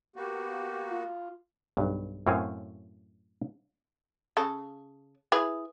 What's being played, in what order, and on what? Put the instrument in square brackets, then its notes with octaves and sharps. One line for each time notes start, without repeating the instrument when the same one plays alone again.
[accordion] A#3 B3 F#4 [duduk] G4
[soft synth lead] F4
[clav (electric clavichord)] B1 G2
F#2 A2 C4 C#5 F5 G#5
[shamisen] C#3 A4
E4 G#4 B4